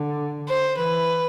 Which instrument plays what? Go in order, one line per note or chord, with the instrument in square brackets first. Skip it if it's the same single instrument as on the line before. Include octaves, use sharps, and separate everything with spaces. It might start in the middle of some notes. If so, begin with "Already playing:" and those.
Already playing: [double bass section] D3
[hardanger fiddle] C5
[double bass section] E3 [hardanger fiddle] B4